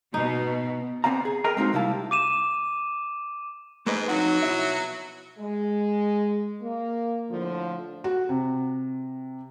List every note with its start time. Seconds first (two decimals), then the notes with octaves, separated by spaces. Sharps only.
0.14 B2 D#4
1.04 B3 C4 D5 F5 A#5
1.25 G#4
1.44 G#4 A#4 B4 D#5 G5 A#5
1.57 G#3 A#3 C4 D#4 F#4
1.73 C2 C3 G3 E4 F5 A5
1.91 G4
2.11 D6 D#7 E7
3.86 G#2 A3 B4 D#5
4.08 F2 F#3 D#4 F#5
4.42 B2 E4 E5
5.39 G#3
6.62 A#3
7.30 A2 D3 F3
8.04 F#4
8.29 C3